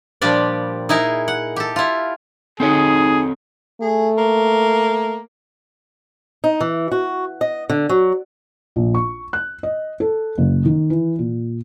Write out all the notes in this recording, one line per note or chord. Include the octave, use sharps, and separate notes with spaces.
A#2 F3 G3 D4 G4 D5
D#4 E4 G#4 A#4
F#5
G4 A4
E4 F4
C4 D#4 G#4 A4 C#5
A3 G#4
A#3
D#4
E3
F#4
D#5
D3
F#3
A#1
C#6
F#6
D#5
A4
F#1
D#3
E3
A#2